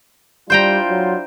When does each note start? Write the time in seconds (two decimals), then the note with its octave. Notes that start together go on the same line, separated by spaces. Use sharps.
0.50 G3 D4 E4 F4 C5 G5 A#5 G6
0.90 F#3